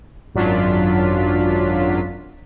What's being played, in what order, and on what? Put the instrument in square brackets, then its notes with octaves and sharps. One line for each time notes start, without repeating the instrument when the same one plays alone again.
[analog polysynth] G#1 F#2 F#3 D4 F4 B6